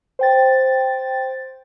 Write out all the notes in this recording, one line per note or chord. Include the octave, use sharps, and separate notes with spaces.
C5 G5 A6